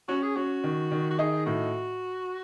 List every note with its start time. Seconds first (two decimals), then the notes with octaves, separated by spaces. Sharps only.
0.08 C#4 F#4
0.23 G#4
0.36 C#4 F#4
0.64 D#3
0.91 D#3
1.10 F#4
1.19 D#4 G#4
1.46 A2 F#4